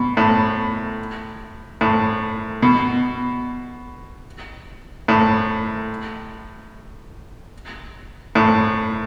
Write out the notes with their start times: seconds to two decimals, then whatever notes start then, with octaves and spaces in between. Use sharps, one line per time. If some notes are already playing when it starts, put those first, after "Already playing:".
Already playing: B2
0.17 A2
1.81 A2
2.62 B2
5.08 A2
8.35 A2